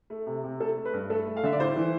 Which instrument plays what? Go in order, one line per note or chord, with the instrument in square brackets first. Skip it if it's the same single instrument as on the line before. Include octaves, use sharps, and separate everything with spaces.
[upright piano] A3
C3
C3
A3 A4
A3
B4
G2
A3 A4
A3
F5
D3 E5
D5
A2 C5
E3